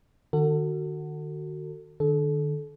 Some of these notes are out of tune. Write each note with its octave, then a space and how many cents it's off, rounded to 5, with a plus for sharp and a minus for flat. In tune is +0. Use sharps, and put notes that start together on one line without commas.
D#3 -35 F#4 +5 A4 +35
D3 +45 A4 -30